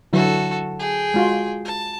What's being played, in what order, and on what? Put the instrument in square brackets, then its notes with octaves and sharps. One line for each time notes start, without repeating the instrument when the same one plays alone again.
[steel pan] D3 F#3 E4 [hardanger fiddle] F#4 A4
[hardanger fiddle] G#4 G5
[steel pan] G#3 F4 F#4
[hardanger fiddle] A5